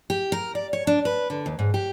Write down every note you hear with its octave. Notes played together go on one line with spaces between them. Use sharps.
G4
A#4
D5
C#5
D4
B4
D3
D#2
G#2
G4